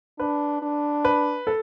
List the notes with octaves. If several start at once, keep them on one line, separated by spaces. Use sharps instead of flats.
D4 B4
D4
B4
A4